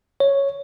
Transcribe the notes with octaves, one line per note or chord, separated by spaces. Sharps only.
C#5